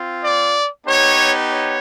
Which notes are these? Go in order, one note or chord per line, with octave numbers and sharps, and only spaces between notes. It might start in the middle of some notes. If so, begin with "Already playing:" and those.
Already playing: C4 F4
D5
B3 D#4 G4 C#5
C#5